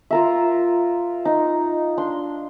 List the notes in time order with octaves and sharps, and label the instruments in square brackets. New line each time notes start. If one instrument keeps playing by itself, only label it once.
[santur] F4 A#4 E5
D#4
D4 C6